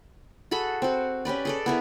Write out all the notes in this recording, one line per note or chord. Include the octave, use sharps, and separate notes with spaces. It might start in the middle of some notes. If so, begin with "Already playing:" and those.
F#4 G#4 A4 B5
C4 F#4
C#4 G4 B4 D5
G#4 A4 D5
B3 E4 G#4 A#4